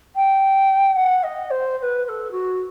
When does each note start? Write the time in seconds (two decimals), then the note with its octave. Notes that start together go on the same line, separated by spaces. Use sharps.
0.16 G5
0.96 F#5
1.23 D#5
1.51 C5
1.78 C5
1.83 B4
2.05 B4
2.09 A4
2.32 F#4